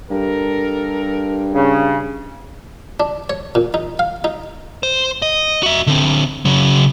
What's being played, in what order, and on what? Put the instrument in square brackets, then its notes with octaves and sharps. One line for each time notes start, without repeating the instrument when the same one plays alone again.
[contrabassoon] G2 [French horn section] G4 A4 A#4
[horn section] C#3
[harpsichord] D4
C#5
A#2
D#4
F5
D#4
[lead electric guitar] C5
D#5
F#4 E5
D3 C4
C#3 F#3